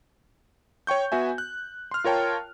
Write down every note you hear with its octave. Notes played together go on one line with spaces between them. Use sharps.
C#5 G5 C#6 G6
B3 F#4 E5 G#5
F#6
C6 F6
F4 A#4 C#5 G5 A5